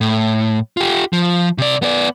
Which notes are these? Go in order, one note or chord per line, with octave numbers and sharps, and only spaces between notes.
A2
F4 G4
F3
C3 D5
B3 D5